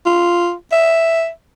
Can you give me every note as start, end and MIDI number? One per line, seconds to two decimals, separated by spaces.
0.06 0.53 65
0.72 1.29 76